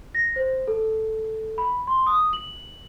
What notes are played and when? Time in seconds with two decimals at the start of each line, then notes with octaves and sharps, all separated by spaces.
0.15 A#6
0.36 C5
0.68 A4
1.58 B5
1.87 C6
2.06 D#6
2.33 F#7